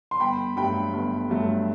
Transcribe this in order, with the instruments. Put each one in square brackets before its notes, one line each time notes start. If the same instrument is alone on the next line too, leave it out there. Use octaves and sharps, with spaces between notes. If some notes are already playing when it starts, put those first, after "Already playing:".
[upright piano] C6
G1 G5 B5
G2 F#3 A3 G5 B5
G1
G2 F#3 A3